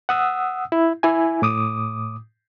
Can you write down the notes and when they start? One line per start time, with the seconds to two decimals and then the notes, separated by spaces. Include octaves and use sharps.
0.09 F#5 D#6 E6
0.72 E4
1.03 E4 G#5
1.42 A2 D6 D#6